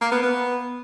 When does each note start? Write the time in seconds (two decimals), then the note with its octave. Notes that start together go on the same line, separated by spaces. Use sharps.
0.01 A#3
0.12 B3
0.22 B3